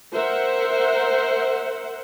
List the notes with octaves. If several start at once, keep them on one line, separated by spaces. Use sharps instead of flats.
A#4 C5 E5 F#5